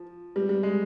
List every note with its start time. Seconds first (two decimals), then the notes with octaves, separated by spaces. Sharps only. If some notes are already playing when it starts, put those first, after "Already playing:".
Already playing: F3
0.36 G3
0.49 G3
0.63 G#3